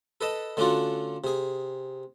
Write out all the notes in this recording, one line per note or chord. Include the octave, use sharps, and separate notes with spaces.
A4 B4 D#5 A5
D3 A3 C#4 D4 F4 F#4
C3 G#4